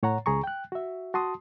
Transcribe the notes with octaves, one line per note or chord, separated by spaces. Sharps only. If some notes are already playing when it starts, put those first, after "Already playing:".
A2 C#5 F#5 A#5
C#2 G#4 A#5 C#6
G5 F#6
F#4 E5
F#4 A5 C6 D#6